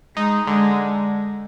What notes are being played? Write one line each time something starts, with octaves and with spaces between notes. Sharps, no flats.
G#3 D#4
D3 G#3